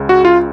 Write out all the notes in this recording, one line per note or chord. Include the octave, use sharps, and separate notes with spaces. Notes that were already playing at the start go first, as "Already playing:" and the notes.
Already playing: C#2 C#3
F#4
F4